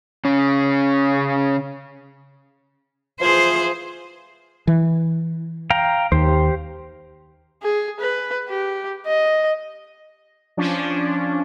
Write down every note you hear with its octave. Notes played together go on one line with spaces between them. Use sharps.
C#3 C#4
E3 F3 G#4 C5
E3
F5 G5 A#5
D#2 G4 C5
G#4
B4
G4
D#5
F3 C#4 D4